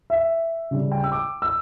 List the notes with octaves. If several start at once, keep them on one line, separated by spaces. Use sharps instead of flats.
E5
C#3 G3
G5
E6
D6
E6